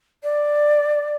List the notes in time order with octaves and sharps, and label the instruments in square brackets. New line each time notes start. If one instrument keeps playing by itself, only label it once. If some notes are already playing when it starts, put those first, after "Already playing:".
[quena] D5